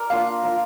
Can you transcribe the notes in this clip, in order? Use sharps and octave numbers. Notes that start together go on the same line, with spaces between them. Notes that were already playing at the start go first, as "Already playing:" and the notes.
Already playing: A#4 D5
A#3 D4 F4 F5
A#3 D4 F4